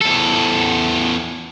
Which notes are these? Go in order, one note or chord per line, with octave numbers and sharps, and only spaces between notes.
E2 A4